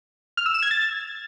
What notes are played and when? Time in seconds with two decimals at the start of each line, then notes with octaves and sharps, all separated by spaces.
0.37 F6
0.46 E6
0.54 E7
0.62 G#6
0.71 A6